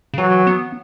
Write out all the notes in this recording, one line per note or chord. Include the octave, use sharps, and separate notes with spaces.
C#3
E3 F#3
B3